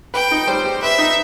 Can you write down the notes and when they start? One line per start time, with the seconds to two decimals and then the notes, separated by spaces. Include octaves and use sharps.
0.14 B4 G5
0.31 D#4
0.47 G3 C5
0.65 G4
0.82 B4 E5
0.98 D#4